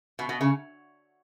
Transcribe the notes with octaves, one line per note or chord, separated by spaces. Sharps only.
B2
B2
C#3